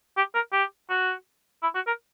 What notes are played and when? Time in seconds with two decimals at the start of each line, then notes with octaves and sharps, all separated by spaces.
0.17 G4
0.35 A#4
0.52 G4
0.90 F#4
1.63 E4
1.75 F#4
1.87 A#4